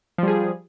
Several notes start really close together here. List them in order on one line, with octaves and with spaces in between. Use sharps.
F3 G3 G#4